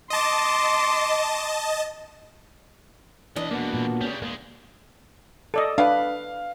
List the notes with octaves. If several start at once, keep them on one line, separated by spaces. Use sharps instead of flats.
D#5 A5 C6 D6
B1 E3 D4 D#5
E2 B2 A#3 B3 F#4
A#2
C#3 G3 C#4
E2 G#3 A#3
A4 D5 D#5
D4 B4 F5